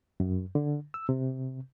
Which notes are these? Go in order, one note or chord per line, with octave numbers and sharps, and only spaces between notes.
F#2
D3
E6
C3